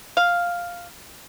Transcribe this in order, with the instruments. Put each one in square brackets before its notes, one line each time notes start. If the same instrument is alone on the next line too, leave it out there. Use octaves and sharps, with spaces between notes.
[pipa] F5